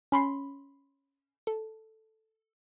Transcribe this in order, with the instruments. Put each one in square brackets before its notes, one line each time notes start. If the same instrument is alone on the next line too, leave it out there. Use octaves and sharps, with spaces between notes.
[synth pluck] C#4 B5 C6 C7
A4